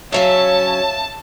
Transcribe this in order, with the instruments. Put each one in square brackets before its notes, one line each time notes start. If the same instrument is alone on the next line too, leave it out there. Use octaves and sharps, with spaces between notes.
[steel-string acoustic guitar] C#3 F#3 C#4 [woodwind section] C#5 [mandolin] E5 F5 G#5 [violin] A5